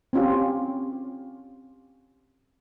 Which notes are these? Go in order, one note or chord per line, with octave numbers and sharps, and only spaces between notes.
C4 C#4 F4 G4